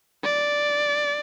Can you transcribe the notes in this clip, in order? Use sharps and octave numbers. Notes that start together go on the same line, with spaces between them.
D5